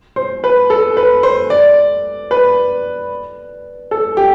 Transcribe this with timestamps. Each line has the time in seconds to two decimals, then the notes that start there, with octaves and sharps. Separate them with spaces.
0.16 C5
0.44 B4
0.70 A4
0.97 B4
1.23 C5
1.50 D5
2.31 B4
3.91 A4
4.17 G4